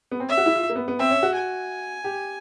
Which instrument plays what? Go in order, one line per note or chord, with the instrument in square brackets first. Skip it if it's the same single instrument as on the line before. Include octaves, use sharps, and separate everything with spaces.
[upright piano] B3
C4
[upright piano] C#4 [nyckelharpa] E5
[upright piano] F#4
E4
F4
A#3
B3
B3
[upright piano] C4 [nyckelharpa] E5
[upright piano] C#4
F#4
[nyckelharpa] G#5
[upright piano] G4